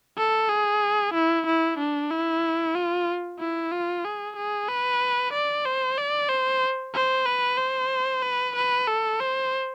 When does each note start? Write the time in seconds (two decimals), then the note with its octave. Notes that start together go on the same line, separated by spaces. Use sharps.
0.17 A4
0.49 G#4
1.13 E4
1.46 E4
1.78 D4
2.11 E4
2.75 F4
3.39 E4
3.71 F4
4.04 G#4
4.36 G#4
4.68 B4
5.33 D5
5.66 C5
5.98 D5
6.29 C5
6.94 C5
7.25 B4
7.58 C5
8.22 B4
8.56 B4
8.87 A4
9.20 C5